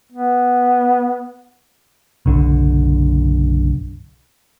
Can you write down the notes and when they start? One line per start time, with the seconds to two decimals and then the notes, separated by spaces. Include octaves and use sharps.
0.12 B3
2.26 F#1 B1 D3